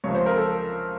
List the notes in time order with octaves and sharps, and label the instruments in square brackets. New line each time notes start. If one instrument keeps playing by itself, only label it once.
[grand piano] C#2 C3 F3 C#5
C5
A#4
A4